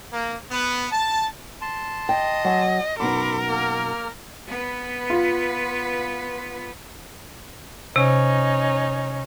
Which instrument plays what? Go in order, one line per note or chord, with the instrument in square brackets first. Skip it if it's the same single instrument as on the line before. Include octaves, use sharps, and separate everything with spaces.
[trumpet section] A#3
B3
A5
[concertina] A5 C6
[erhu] D#5 [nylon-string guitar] G5
[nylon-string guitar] F#3 G#5
[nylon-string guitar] F#2 B2 D#4 [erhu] A#4 [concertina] B5 C6 D6
[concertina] A#3 F6
[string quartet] B3 B4
[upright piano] F4
[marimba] C3 [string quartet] C#4 D#4